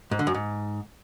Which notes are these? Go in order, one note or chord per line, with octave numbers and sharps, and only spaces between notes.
G#2
D3
F#2
G#2